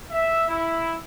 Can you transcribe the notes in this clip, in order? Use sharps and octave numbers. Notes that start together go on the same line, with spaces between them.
E5
E4